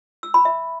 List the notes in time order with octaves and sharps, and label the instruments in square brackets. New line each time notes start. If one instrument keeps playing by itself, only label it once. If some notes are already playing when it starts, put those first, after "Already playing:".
[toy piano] E6
B5
E5